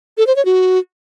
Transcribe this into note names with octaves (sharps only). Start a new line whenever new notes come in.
A4
C5
C#5
F#4